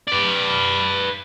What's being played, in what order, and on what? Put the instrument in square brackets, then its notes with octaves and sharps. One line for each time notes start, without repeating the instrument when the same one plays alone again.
[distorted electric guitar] B4 D5